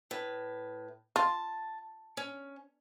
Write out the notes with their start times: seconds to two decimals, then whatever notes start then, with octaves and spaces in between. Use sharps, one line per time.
0.11 A2 B4
1.16 F4 A5
2.17 C#4